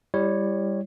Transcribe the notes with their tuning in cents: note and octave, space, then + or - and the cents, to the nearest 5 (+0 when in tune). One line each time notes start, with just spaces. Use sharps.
G3 +15 E4 +15 C#5 -10